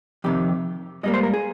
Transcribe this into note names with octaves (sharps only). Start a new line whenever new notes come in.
F2 C3 D#3 G4
G#2 G3 A#3 D#5
C5
A#4
G#4